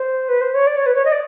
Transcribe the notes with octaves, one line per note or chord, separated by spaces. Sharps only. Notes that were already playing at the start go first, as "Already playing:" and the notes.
Already playing: C5
B4
C5
C#5
D5
C#5
B4
C#5
D#5
D5